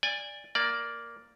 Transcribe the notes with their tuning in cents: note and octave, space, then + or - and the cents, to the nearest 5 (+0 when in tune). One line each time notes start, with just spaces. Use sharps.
D5 +0 G#5 -25
A#3 +0 D5 +0